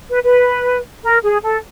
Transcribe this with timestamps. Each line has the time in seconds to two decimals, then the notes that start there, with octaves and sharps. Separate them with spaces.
0.10 B4
0.23 B4
1.03 A#4
1.23 G#4
1.43 A4